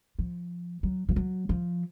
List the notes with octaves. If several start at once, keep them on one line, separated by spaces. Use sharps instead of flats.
F3
F#3
F3
F#3
F3